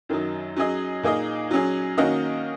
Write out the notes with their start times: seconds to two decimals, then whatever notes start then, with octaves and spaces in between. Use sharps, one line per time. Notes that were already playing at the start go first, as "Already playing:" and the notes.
0.09 F#2 D#3 F#3 D#4
0.56 F#3 C#4 G#4 D#5
1.03 A#2 A#3 D#4 G#4 D#5
1.51 F#3 C#4 G#4
1.98 D#3 A#3 C#4 F#4 D#5